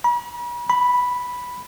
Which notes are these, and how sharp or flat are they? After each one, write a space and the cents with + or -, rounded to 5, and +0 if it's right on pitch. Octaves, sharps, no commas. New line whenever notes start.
B5 -40
B5 +0